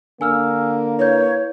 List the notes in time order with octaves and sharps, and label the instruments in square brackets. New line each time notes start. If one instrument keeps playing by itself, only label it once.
[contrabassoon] D3 [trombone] A#3 [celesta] G#5 E6 F6
[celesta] E4 B4 G6 [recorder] C#5